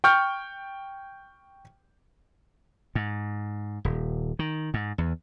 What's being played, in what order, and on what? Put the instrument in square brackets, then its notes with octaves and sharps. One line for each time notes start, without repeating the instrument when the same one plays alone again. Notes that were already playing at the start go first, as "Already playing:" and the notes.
[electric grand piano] G5 C#6 F6 G6
[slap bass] G#2
D#1
D#3
G#2
E2